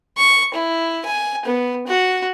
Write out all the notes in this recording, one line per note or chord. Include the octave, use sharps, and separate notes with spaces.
C#6
E4
G#5
B3
F#4